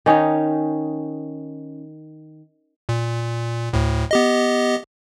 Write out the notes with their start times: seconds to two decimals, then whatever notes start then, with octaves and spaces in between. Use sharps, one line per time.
0.06 D#3 C#4 D#4 C#5
2.89 A#2
3.73 D2 A2
4.11 B3 G4 D#5